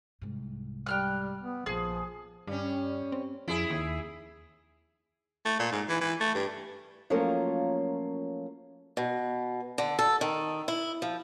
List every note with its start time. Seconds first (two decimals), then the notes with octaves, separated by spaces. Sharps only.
0.21 C2 G#2
0.86 G3 G5 F6 F#6
1.41 B3
1.66 A#1 F3 C4 G#4
2.47 G2 G3 C#4
3.12 C4
3.48 F2 E4 G#4
3.70 D#2
5.45 A3
5.59 A#2
5.72 G#2
5.89 E3
6.01 E3
6.20 A3
6.34 G2
7.10 F3 F#3 A3 A#3 C#4 F4
8.97 B2
9.78 D3
9.99 A4
10.21 D#3
10.68 E4
11.02 F3